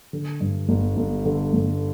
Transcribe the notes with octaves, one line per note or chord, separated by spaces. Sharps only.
D3
G2
G1
G1
D3
G1